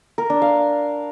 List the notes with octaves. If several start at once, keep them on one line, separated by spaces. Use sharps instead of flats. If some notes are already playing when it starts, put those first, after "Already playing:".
A#4
D4
F5